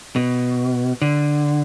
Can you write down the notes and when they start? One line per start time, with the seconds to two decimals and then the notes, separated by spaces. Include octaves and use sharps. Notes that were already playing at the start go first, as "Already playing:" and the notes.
0.16 B2
1.02 D3